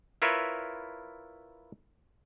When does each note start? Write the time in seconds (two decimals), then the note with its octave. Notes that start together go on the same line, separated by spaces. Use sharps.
0.22 E4 F4 A#4 B4 C#5 E5